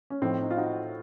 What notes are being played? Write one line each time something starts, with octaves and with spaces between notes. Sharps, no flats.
C#4
A2 F3 C4 D#4
D#4
F4
D#4 F#4